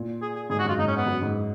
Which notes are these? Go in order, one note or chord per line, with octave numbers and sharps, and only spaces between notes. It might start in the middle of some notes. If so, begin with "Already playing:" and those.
Already playing: A#2
G#4
G#4
G#2 G#4
F#4
F#2 F4
G#2 D#4
C#4
B3
F#2
G#2